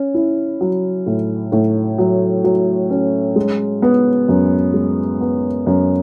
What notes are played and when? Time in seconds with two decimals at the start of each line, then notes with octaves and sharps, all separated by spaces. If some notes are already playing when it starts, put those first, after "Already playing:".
Already playing: C#4
0.14 E4
0.61 F#3
1.06 A2
1.52 A2
1.98 F#3
2.44 F#3
2.90 C#4
3.36 G#3
3.82 B3
4.29 F#2
4.74 G#3
5.21 B3
5.67 F#2